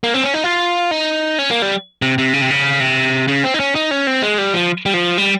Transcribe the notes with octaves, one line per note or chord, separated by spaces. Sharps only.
A#3
C4
C#4
D#4
F4
D#4
C#4
A#3
G3
C3
C3
C#3
C3
C#3
C3
C#3
C4
D#4
C#4
D#4
C#4
C4
G#3
G3
F3
G3
F3
G3